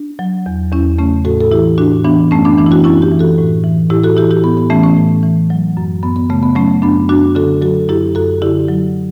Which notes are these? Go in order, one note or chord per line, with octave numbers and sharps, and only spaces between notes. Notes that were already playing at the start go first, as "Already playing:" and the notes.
Already playing: D4
F#3
E2
E2 C#4 E4
C#3 A3 C#4
A2 F#4 A4
A4
E3 E4 G4
A2 D4 F#4
E3 B3 D4
F#2 A3 C#4
B3 D4
E3 B3 D4
E4
D4 F#4
F#2 C#4 E4
E4 G4
E3
F#4 A4
A2
E3
A2 E4 G4
F#4 A4
E3 E4 G4
E4 G4
A2 B3
B3
E3 A3 C#4
A3 C#4
A2
E3
F#3
F#2
F#2 B3
B3
C#3 A3
B3
F#3 A3 C#4
F#2 B3 D4
F#2 D4 F#4
D3 F#4 A4
F#3 F#4 A4
F#2 E4 G4
F#2 F#4 A4
D3 E4 G4
F#3